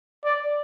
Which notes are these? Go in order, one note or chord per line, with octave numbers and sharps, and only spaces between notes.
D5